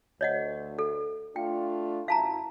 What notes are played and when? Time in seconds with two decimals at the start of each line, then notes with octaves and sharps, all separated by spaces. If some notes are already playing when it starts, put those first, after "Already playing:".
0.21 D2 C#5 D#5 F#5
0.79 A4
1.36 A3 D4 F4 G5
2.08 F#2 E4 F5 A5 A#5